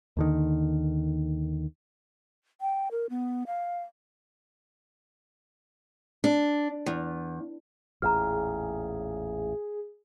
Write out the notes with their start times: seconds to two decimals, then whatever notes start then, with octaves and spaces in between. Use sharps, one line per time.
0.17 D#2 D3 D#3
2.61 G5
2.91 A#4
3.10 B3
3.47 F5
6.24 D4
6.86 E2
8.02 A1 E2 A#2 G#4 A#5 F6